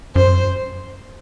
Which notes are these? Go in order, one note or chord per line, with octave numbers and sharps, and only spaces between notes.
F#2 C5